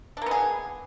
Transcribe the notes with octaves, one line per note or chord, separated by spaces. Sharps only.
A#3 B3 D4 G#4